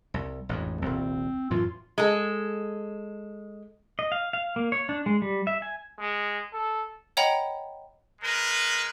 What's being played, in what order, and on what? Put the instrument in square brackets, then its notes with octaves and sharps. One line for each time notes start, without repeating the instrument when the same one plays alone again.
[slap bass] C2
A1 F2 G#2
[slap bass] D#1 C2 [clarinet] C4
[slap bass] F#2 A2 E3 [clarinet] F4
[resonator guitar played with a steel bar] G#3 A4
[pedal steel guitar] D#5
F5
F5
A#3
C#5
D4
G#3
G3
E5
G#5
[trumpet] G#3
A4
[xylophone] C#5 D#5 F#5 G5 A#5 B5
[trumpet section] G#3 A#4 B4